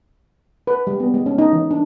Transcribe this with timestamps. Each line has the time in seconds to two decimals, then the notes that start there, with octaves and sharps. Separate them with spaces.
0.67 B4
0.87 G3
1.00 B3
1.14 G#3
1.26 C#4
1.38 D#4
1.53 E3
1.71 D4